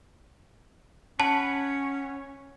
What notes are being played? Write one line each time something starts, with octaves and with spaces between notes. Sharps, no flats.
C#4 C#5 F#5 A5 B5